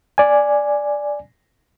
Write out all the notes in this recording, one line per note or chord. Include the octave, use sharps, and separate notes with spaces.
D5 G#5